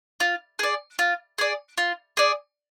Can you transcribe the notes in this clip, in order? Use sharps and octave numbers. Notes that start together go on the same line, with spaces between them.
F4
G#4 D5
F4
G#4 D5
F4
G#4 D5